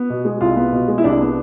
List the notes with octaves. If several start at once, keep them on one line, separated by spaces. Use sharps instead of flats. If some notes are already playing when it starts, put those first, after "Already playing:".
Already playing: B3
B2
G#3
C2 F4
B3
B2
G#3
E4
C2 D4
B3